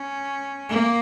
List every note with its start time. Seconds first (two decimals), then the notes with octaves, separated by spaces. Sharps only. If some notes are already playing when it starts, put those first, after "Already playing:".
Already playing: C#4
0.69 A#3